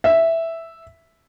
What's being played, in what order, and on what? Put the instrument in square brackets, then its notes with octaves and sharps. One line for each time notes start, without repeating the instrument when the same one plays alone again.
[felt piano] E5